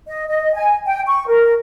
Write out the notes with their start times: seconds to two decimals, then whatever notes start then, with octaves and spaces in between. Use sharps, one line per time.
0.08 D#5
0.28 D#5
0.53 G#5
0.86 G5
1.06 C#6
1.27 A#4